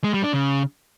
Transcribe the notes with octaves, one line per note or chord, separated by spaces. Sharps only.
G#3
G3
D4
C#3